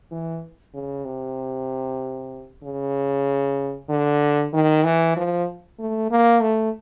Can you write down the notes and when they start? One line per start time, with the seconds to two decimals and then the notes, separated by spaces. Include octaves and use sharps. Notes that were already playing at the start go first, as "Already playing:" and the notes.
0.11 E3
0.74 C#3
1.05 C3
2.63 C#3
3.89 D3
4.53 D#3
4.84 E3
5.16 F3
5.79 A3
6.11 A#3
6.42 A3